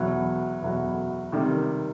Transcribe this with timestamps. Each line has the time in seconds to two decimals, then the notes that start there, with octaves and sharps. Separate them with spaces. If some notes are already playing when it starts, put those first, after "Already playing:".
Already playing: E2 B2 F#3
0.62 E2 B2 F#3
1.32 C3 D#3 G3